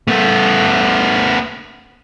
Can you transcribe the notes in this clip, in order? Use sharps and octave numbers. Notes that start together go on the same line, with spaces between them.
A3 B3